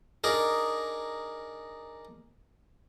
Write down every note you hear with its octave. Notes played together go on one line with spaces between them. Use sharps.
D4 D#4 G#4 A#4